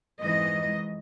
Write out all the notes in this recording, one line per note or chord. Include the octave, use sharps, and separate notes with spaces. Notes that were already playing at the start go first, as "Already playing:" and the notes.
F2 G#2 E3 D#5